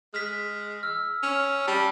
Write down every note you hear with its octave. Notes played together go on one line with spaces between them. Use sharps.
G#3 F6 B6
E6 F6
C#4
G3 A5